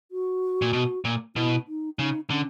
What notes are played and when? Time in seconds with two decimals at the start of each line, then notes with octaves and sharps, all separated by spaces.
0.11 F#4
0.62 A#2
0.73 B2
1.05 A#2
1.36 B2 E4
1.68 D#4
1.98 C#3 D#4
2.30 D3 C#4